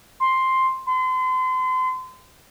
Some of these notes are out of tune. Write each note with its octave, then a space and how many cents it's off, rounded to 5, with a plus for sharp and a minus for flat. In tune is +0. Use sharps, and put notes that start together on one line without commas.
C6 +5
C6 -35